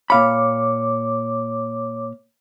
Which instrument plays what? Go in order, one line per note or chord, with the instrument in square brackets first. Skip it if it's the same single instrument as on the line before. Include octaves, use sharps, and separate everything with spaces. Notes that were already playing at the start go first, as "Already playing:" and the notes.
[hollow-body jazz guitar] A#2 F5 B5 [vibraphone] C#5 D6